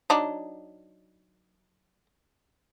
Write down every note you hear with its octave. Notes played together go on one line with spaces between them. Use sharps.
F#3 D4 D#4